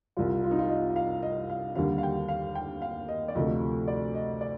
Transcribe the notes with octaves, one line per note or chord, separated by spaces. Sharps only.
C2 C3 G3 F4
F4
D#4
F4
D#5
F5
D#5
F5
D#2 D3 G3 F5
F5
G5
F5
G5
F5
D#5
D5
D2 C3 F3 A3 D#5
D5
D#5
D5